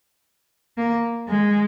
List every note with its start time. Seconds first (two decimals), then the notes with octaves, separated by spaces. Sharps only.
0.77 A#3
1.28 G#3